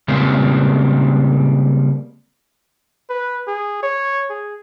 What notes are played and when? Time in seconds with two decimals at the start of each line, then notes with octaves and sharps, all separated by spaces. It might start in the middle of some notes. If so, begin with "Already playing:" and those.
0.08 C#3 G3 G#3 A#3 C4 B4
3.09 B4
3.47 G#4
3.83 C#5
4.30 G#4